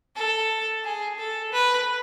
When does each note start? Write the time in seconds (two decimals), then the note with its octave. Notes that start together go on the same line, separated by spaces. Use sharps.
0.16 A4
0.84 G#4
1.18 A4
1.52 B4